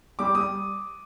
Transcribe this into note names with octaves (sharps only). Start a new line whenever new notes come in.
G3 D6
G3 D#6